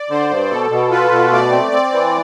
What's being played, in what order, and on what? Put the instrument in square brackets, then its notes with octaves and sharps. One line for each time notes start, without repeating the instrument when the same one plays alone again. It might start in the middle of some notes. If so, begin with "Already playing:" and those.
Already playing: [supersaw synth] D5
[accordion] D3 [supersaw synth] C5
[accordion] G2
[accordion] B2 [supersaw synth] A4
[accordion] B2
[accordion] F4 [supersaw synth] B4
[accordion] B2
[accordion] A3 [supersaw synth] D5
[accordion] C4
[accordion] C4 [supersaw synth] D5
[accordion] E3